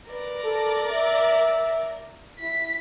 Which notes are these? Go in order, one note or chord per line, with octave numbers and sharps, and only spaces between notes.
A#4 B4 D5
A4
E5
E4 B6